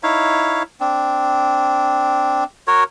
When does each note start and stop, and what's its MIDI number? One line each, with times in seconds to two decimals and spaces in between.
0.03 0.63 63
0.03 0.63 64
0.03 0.63 73
0.03 0.63 77
0.80 2.44 60
0.80 2.44 62
2.67 2.84 66
2.67 2.84 70
2.67 2.84 73